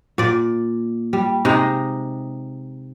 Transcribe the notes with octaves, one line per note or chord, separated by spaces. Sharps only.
A#2 D5
G3
C3 G#3 D#4